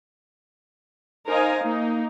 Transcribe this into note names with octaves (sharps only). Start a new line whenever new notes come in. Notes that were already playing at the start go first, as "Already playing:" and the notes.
D#4 A#4 C5 D#5 F5 G#5
A#3 D#4